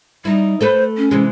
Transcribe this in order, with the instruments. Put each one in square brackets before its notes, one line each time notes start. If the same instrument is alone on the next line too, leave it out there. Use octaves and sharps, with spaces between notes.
[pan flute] G3 [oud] D#4 E4
[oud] A3 A4 B4 [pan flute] C5
[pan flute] C#4
[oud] C3 E3 G#3